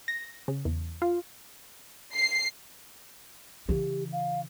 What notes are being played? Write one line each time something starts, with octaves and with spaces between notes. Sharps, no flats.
A#6
C#3
E2
F4
C7
C#3 E3 G4
F5